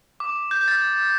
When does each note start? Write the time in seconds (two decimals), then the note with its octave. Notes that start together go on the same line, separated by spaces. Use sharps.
0.20 D6
0.51 G6
0.61 G6
0.68 A6